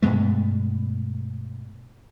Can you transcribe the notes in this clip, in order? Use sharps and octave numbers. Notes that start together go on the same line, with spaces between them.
G2 B2 G#3 A3